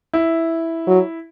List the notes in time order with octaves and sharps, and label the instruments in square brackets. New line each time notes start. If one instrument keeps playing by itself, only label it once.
[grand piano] E4
[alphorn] F#3